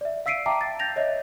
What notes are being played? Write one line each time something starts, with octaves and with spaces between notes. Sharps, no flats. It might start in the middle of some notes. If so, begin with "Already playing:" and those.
D5 E5
F5 E6 B6 C7 D7 D#7
E5 G5 A5 A#5 D6
A6
G6 A6 A#6 F7
C#5 D#5 E5